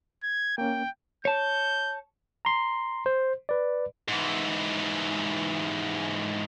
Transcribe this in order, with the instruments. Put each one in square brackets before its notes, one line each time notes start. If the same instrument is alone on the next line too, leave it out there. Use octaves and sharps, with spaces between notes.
[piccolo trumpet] G#6
[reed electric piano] A#3 C#4 [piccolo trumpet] G5
[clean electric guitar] C#5 A5 [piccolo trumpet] G6
[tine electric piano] A#5 C6
C5
B4 D5
[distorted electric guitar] G#2 E3